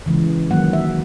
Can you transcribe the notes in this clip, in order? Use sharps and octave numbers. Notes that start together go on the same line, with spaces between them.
C#3 E3 G#3
D#3 F#3 A#3 F#5
E5